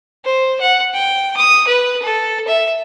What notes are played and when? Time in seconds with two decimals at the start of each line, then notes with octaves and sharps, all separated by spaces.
0.25 C5
0.61 F#5
0.94 G5
1.37 D#6
1.67 B4
2.02 A4
2.48 E5